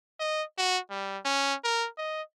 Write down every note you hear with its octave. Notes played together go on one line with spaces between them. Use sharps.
D#5
F#4
G3
C#4
A#4
D#5